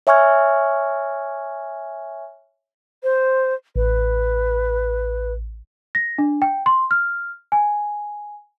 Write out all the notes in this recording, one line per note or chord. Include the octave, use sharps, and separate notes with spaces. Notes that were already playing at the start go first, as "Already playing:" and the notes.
C#5 E5 G#5 C#6 F6 G#6
C5
A1 B4
A#6
D4
G5
C6
F6
G#5